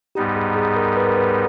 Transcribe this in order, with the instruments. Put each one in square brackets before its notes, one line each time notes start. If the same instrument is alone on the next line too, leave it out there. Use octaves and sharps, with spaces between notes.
[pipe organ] G#2 G3 B3 D#4 [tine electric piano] G4
[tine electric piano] G#4
G#4
A#4
B4
A#4
B4